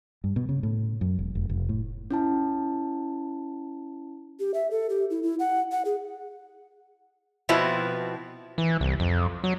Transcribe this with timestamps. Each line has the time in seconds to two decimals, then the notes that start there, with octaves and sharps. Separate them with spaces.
0.24 G2
0.36 B2
0.49 C#3
0.63 A2
1.01 F#2
1.19 E1
1.35 F1
1.49 F1
1.69 A2
2.11 C#4 E4 A5
4.39 G4
4.54 E5
4.71 A4
4.90 G4
5.10 E4
5.23 E4
5.39 F#5
5.72 F#5
5.85 G#4
7.49 B2 F3 B3 C4 E4 F#4
8.58 E3
8.81 C2
9.00 F2
9.44 F#3